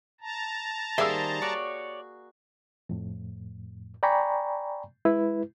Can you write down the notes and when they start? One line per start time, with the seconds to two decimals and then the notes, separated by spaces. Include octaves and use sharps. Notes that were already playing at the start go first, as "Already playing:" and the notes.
0.21 A5 A#5
0.98 D#3 G3 A#3 G#4 C5 E5 E6
1.42 F#4 C#5 D5
2.89 F2 A2
4.03 D5 G5 G#5 A#5 B5 C#6
5.05 G#3 E4 B4